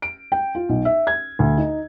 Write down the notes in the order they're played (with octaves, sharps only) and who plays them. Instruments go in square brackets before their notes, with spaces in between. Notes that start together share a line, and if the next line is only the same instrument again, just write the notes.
[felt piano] D7
G5
F4
B1
E5
G#6
D2
D#4